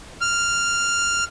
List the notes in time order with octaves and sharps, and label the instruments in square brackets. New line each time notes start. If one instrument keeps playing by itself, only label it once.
[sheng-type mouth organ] F6